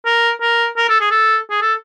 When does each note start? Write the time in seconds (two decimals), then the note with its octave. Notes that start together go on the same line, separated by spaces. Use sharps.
0.06 A#4
0.41 A#4
0.77 A#4
0.89 A4
1.01 G#4
1.11 A4
1.50 G#4
1.62 A4